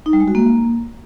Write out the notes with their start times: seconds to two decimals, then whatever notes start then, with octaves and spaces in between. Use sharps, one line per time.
0.06 D#4
0.13 G3
0.20 G#3
0.28 F#4
0.35 A#3